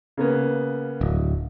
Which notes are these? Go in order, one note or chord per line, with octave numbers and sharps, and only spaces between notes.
C#3 A#3 B3
D1